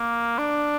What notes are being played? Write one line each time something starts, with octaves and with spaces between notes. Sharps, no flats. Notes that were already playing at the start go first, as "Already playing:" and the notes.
Already playing: A#3
D4